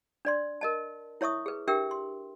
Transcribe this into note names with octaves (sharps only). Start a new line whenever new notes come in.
D4 D5 C6
A#4 D#5 A5
E4 C#5 E5 C#6 D#6
G#4 B4
D4 G4 A#4 E5 G5 E6
C6